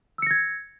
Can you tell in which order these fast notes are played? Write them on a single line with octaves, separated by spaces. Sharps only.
E6 C#7 A#6 G#6